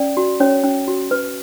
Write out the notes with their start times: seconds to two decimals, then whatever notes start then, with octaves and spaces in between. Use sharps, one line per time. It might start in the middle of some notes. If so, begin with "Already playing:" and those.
Already playing: C#4 D5
0.17 F#4
0.40 C#4 C#5
0.64 C#4
0.88 F#4
1.11 B4